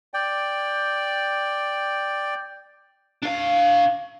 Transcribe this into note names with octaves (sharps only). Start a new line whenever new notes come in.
D5 G5
D4 F5